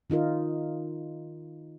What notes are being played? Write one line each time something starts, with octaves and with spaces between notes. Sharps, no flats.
D#3 D#4 F4 A#4